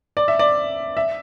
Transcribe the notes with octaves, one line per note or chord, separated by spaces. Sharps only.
D5
E5
D5
E5